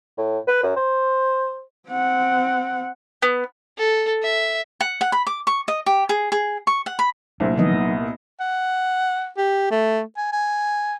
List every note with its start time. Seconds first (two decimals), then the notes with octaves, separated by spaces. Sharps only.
0.18 A2
0.48 B4
0.63 F#2
0.77 C5
1.89 C4 F#5
3.22 B3
3.78 A4
4.23 E5
4.81 F#5
5.01 F#5
5.12 B5
5.27 D6
5.47 C#6
5.68 D#5
5.86 G4
6.09 G#4
6.32 G#4
6.67 C#6
6.86 F#5
6.99 B5
7.40 C2 A#2 F#3 A3 D4 C5
7.57 D#3 F3 F#3 G#3 B3 D#4 B4 D#5
7.73 A#3
8.40 F#5
9.37 G4
9.71 A3
10.17 G#5
10.33 G#5